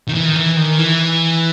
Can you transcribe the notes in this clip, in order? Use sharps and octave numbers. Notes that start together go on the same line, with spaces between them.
D#3
E3
D#3
E3
D#3
E3